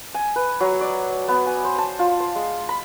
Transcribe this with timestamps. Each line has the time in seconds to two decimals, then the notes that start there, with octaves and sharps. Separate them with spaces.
0.14 G#5
0.36 B4
0.60 F#3
0.81 D5
1.28 B3
1.46 G#5
1.64 C5
1.78 A5
1.99 F4
2.20 C5
2.36 G#3
2.69 B5